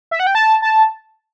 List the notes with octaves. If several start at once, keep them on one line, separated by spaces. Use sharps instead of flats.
E5
F#5
G5
A5
A5